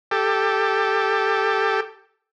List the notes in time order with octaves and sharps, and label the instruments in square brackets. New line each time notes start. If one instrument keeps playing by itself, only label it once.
[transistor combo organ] G4 A4